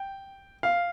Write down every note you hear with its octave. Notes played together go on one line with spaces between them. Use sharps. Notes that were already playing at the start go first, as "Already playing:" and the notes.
Already playing: G5
F5